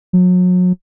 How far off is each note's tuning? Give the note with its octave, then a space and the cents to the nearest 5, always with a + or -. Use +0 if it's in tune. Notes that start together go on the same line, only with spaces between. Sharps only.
F#3 -35